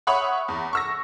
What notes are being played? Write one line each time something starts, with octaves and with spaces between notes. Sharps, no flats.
C#5 E5 F#5 B5 C#6 D#6
E2
C#6 E6 A#6